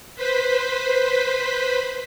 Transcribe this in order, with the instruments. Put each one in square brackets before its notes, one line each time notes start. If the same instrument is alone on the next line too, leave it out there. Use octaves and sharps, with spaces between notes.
[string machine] B4 C5 B5